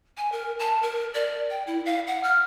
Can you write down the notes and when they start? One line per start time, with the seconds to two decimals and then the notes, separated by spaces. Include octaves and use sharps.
0.17 G#5
0.32 A#4
0.59 A5
0.83 A#4
1.14 D5
1.50 G5
1.67 E4
1.86 F5
2.07 F#5
2.23 F6